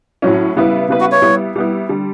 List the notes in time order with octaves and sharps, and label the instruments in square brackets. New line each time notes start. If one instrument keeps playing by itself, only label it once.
[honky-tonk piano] A2 F#3 C#4
C#3 G3 B3 E4 B4
C#3 G3 B3 E4 B4
[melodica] F#4
C#5
[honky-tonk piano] G3 B3 E4
G3 B3 E4
D3 G3